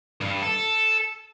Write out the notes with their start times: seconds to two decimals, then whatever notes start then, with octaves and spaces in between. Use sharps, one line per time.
0.21 G2
0.42 A4